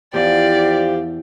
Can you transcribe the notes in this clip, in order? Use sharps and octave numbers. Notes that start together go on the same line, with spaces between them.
E2 F3 G4 D5